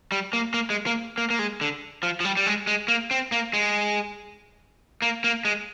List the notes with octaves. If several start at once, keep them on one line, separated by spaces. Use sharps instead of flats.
G3
A#3
A#3
G#3
A#3
A#3
A#3
G#3
D3
F3
F3
G3
G3
G#3
G#3
A#3
C4
A#3
G#3
A#3
A#3
G#3